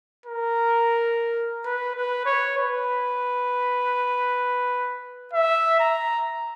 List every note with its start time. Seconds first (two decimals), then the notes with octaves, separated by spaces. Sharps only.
0.26 A#4
1.65 B4
1.95 B4
2.26 C#5
2.57 B4
5.34 E5
5.80 A#5